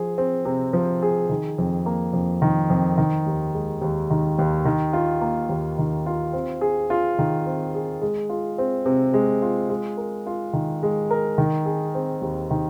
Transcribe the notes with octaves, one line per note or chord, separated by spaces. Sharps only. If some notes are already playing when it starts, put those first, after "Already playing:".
Already playing: F3 G#4
C4
C3
F3
G#4
D#3
F2
A#3
F2
D#3
F2
D#3
D#2
G#3
D#2
D#3
D#2
D#3
F4
A#3
D#2
D#3
F4
C4
G#4
F4
D#3
C4
G#4
G#3
F4
C4
C3
G#3
F4
G#3
A#4
F4
D#3
G#3
A#4
D#3
G#4
C4
D#2
D#3